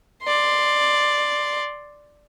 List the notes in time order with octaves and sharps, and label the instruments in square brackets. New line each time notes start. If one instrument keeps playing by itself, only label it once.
[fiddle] D5 C6